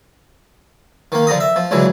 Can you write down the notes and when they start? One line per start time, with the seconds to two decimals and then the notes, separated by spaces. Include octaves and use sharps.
1.12 D#3 A#3
1.27 D3 F3 A#5 D#6
1.40 E5
1.56 F3
1.71 C#2 D3 E3 F#3